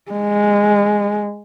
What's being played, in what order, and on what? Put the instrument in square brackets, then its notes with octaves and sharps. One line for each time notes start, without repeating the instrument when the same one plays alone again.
[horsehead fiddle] G#3